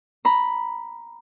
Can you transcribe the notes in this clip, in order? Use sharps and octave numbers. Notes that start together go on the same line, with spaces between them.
A#5 B5